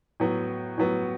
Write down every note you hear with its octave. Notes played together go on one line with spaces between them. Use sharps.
A2 F#3 B3
A2 F#3 B3